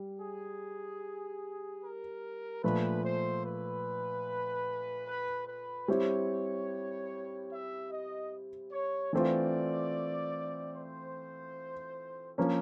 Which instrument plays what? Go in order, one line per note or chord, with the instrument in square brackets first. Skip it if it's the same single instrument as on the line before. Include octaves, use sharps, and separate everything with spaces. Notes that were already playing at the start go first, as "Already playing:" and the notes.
Already playing: [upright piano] G3
[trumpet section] G#4
A#4
[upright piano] A#2 F3 A3 [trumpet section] B4
[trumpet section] C5
B4
B4
B4
[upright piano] G3 C4 E4 G4 [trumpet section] C#5
[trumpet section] E5
D#5
C#5
[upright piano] E3 A3 C4 F4 [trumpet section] D5
[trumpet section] C5
[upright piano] F3 A#3 C#4